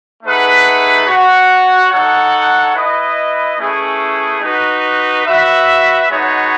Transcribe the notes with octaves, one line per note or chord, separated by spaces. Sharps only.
A3 D#4 G#4 B4 F#5
F#4 C#5 F#5
D#4 A4 C#5 F#5
E4 B4 D#5
A3 C#4 E4 G#4 B4
D#4 F#4 B4
F#4 B4 E5
G#3 B3 D#4 F#4 C#5